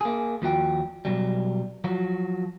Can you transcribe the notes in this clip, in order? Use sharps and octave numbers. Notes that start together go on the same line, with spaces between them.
A#3 G#4
D#2 F3 F#4 G5
B2 F#3 G3
F3 F#3 F#4